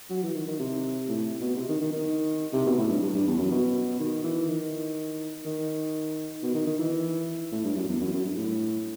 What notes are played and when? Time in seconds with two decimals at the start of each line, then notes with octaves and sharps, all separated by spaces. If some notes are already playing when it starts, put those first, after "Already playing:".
0.10 F#3
0.23 E3
0.35 D#3
0.47 D#3
0.59 C3
1.08 A2
1.41 B2
1.56 C3
1.69 D#3
1.81 D#3
1.93 D#3
2.53 C3
2.66 B2
2.78 A2
2.90 G2
3.02 G2
3.14 G2
3.27 E2
3.39 F#2
3.51 B2
3.99 D#3
4.24 E3
4.48 D#3
5.45 D#3
6.43 B2
6.54 D#3
6.67 D#3
6.79 E3
7.52 A2
7.64 G2
7.76 F#2
7.88 E2
8.01 F#2
8.13 F#2
8.25 G2
8.36 A2